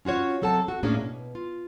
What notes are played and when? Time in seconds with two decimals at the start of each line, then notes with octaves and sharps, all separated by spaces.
0.05 C#4 F4 F#4 C#5
0.42 F#3 C4 A4 F#5 A5
0.68 F#4
0.83 A2 A#3 C#4 D4 G#4
1.00 B2
1.35 F4